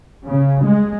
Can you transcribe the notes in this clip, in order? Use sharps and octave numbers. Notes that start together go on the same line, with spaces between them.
C#3
G#3